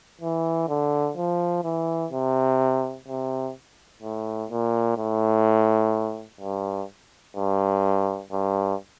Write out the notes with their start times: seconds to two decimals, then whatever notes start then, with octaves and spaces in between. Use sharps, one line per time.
0.21 E3
0.68 D3
1.17 F3
1.64 E3
2.12 C3
3.08 C3
4.03 A2
4.50 A#2
4.97 A2
6.41 G2
7.36 G2
8.32 G2